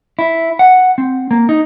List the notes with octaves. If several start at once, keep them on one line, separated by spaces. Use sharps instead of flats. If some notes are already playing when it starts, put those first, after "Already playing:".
E4
F#5
C4
A#3
D#4